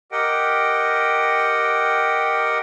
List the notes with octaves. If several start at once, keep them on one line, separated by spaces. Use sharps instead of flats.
G4 A#4 D#5 F#5 G5